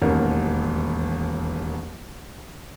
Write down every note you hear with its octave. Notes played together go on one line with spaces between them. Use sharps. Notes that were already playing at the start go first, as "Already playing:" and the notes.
E1 A1 D#2 A#4